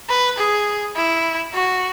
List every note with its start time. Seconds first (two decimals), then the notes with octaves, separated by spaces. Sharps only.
0.09 B4
0.38 G#4
0.96 E4
1.54 F#4